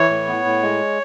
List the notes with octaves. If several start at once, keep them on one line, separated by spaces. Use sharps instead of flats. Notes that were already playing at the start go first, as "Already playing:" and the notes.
Already playing: E3 C#5
A2
B3
A2
G#3